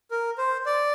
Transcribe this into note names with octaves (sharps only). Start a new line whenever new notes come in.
A#4
C5
D5